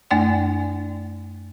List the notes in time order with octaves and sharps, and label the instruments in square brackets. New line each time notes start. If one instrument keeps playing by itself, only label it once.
[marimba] F#2 A3 D4 D5 G5 G#5